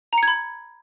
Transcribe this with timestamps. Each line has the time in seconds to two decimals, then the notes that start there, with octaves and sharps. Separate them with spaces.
0.13 A#5
0.18 C#7
0.23 G#6
0.28 B5